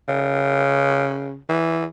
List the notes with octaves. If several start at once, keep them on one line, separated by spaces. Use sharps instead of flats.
C#3
E3